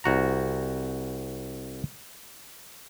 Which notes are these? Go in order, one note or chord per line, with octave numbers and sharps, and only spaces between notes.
C2 F#4 A#5